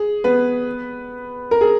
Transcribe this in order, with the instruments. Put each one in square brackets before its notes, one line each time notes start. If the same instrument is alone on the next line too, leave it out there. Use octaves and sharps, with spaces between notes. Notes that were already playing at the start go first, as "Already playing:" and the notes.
Already playing: [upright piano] G#4
B3 B4
A#4
G#4